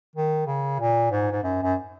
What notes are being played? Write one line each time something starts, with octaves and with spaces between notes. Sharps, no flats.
D#3
C#3
A#2
G#2
G#2
F#2
F#2